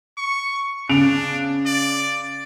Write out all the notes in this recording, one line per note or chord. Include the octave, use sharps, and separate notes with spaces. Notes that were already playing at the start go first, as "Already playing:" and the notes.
C#6
C#3 D4 D7 F7
D5